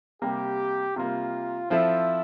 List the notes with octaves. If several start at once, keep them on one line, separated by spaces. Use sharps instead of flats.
C3 G3 A#3 G4
C3 G3 A#3 F4
F3 C4 E4 A4 E5